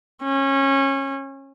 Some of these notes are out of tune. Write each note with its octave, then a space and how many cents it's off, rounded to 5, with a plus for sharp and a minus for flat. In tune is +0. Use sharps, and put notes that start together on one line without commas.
C#4 -25